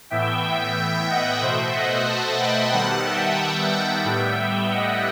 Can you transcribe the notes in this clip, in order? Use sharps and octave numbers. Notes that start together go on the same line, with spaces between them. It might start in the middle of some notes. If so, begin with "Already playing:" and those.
A2 E3 B3 E5 G5
E5 G5
E5 G5
D#5 F#5
B2 A3 C5 E5
D#5 F#5
F#5 A5
G5 B5
D#3 G3 B3 F#5 A5
E5 G5
A2 G3 B3
D#5 F#5